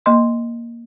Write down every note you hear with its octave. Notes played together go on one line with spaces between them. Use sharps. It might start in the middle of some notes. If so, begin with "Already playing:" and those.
A#3 D#5 C6